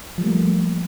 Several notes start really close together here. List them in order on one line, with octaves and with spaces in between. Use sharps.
F3 G3 A3 A#3